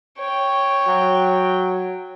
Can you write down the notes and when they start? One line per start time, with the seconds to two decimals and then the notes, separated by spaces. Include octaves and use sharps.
0.18 C#5 G5
0.88 F#3